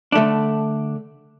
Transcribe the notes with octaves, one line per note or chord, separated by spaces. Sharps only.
D3 A3 D4